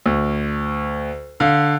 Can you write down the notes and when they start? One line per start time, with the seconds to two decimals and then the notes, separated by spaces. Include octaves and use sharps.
0.06 D2
1.40 D3 F5